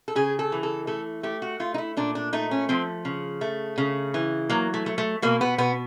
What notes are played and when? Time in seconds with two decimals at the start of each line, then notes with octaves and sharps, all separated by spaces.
0.08 A4
0.15 C#3 G#4
0.39 A4
0.52 E3
0.63 A4
0.87 A3 A4
1.23 A3 G4
1.42 F#4
1.60 A3 F4
1.74 D#4
1.78 E4
1.97 A#2 D4
2.15 D4
2.33 A3 D#4
2.51 C#4
2.69 F3 C4
3.05 C#3
3.41 A3
3.78 C#3
4.14 E3
4.50 F#3 A#3
4.74 A3
4.86 A3
4.98 A3
5.22 B2 A#3
5.41 B3
5.58 B2 B3